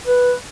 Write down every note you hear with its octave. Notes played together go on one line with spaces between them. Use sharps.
B4